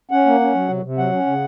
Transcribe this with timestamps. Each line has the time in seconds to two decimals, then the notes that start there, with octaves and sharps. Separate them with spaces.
0.11 C#4 F#5
0.26 A#3
0.41 C#4
0.54 F#3
0.69 C3
0.83 C3
0.98 F#3 F#5
1.12 C#4
1.26 C#3